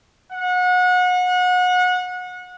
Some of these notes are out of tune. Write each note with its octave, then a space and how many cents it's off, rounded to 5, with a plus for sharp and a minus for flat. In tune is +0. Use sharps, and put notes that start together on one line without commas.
F#5 -30